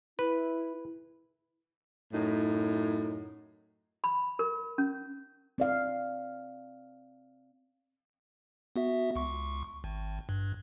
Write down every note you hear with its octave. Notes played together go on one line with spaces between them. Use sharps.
E4 B4
F#2 A2 D#4
B5
A#4
C#4
C4 D5 F5
B3 F#4 E5
C#2 C#6
G#1
G2